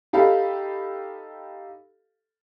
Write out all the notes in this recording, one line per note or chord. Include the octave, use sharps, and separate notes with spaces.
D#4 G4 A4 F5 B5